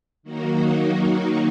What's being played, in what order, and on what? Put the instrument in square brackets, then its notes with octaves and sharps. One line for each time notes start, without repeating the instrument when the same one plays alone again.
[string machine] D#3 F#3 A#3 D#4 F#4